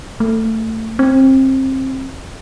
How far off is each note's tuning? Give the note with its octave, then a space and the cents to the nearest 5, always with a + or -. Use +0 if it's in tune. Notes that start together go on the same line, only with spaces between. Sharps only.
A3 +20
C4 +25